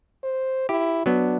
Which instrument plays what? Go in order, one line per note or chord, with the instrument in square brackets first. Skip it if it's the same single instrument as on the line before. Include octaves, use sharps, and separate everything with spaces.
[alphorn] C5
[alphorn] E4 [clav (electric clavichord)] G4
[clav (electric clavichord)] F#3 B3 [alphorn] D4